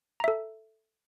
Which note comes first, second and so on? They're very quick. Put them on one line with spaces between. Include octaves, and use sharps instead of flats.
A#5 E5 A4